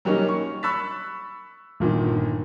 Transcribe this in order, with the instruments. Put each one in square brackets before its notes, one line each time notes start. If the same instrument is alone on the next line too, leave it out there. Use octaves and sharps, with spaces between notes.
[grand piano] F#3 G3 A#3 C#4 D#4
C#6
B5 C#6 E6 F#6 A6 B6
G1 A#2 D#3